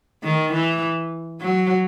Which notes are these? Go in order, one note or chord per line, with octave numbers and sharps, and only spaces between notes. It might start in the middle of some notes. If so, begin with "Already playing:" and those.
D#3
E3
F#3